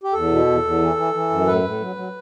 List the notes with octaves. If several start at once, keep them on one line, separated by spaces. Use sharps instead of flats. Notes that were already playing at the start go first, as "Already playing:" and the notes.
G4
E2 A4
B2
E2
E2
E3
E3
E3
F#2
A2 B4
A2
F#3
F#3